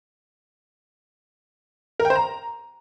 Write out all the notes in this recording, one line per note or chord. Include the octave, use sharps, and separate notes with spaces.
A#4
G5
C5
A#5